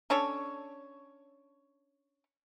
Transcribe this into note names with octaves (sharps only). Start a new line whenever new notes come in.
C#4 D4 A4 C#5